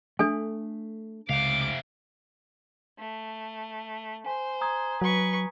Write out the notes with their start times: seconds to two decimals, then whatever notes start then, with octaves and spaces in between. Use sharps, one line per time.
0.19 A3 D4 A4 G#5
1.29 C#2 C3 F5 D6
2.99 A3
4.26 C5 G#5
4.61 A#5 D#6 G#6
5.02 F#3 B4 C#6